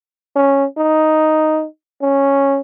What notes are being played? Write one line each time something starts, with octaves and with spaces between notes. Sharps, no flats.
C#4
D#4
C#4